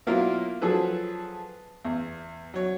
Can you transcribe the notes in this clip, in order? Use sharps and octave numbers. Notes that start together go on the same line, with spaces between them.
B2 F#3 A#3 E4 F4 A#4
F3 F#3 G#4 A4 B4
E2
F#3 C#5